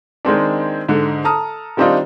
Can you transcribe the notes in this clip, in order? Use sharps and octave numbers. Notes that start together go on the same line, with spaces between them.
D#3 G#3 C4 D4
G#2 D3
A4 A5 A#5 D#6 F6
D#3 G3 C4 D4 D#4 F4